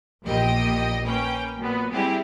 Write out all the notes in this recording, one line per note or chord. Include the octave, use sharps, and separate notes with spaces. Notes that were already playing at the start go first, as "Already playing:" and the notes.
A#1 E2 A#2 G4 D#5 G5
A#3 C#4 B4 G5
A#2 F#3 B3
G3 G#3 C4 E4 G4 G#4